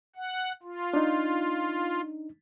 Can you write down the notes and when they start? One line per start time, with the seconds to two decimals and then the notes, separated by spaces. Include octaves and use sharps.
0.16 F#5
0.63 F4
0.94 D4 D#4